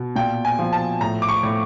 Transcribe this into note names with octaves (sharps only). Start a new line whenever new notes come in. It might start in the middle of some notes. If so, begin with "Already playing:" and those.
Already playing: B2
A#2 G5
G#5
F3
A5
A2 A#5
D6
C#6
A2